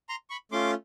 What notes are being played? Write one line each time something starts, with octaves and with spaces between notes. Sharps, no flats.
A#5 C6
B5 C#6
A3 C#4 F4 C6 D6